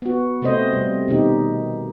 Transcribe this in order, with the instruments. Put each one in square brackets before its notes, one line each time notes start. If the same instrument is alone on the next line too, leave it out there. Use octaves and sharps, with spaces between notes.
[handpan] B3 F#4
C3 A3 C4 C5 D#5
C3 G3
B2 D#3 D#4 G4